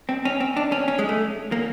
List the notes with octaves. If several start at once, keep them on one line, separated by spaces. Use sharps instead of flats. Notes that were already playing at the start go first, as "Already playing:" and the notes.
C4
C#4
C4
D4
C#4
C#4
G#3
A3
A#3